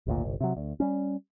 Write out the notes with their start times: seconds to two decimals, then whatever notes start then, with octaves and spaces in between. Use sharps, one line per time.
0.07 G#1 D2 A#2
0.24 G1 C2
0.41 C3 F#3
0.57 D2
0.80 G3 C#4